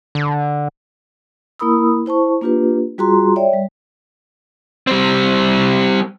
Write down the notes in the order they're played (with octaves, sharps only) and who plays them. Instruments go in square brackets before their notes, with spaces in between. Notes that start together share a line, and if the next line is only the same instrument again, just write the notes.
[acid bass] D3
[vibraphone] A#3 E4 A#4 B5 D#6 E6
E4 C5 A5 C#6
A#3 D4 F4 G4 B4
G3 F4 F#4 G#4 A#5 C6
C#5 D5 E5 G5
G3
[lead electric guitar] G3 C4